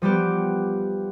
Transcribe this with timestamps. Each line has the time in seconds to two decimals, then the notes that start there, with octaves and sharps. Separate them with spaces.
0.02 F3 G3 B3 G4